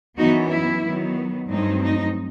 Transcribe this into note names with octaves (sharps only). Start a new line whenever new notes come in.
F#2 E3 B3 D#4 F#4
E4
D#3 F#3 B3
G2 F#3 A3 C4 D#4
D#4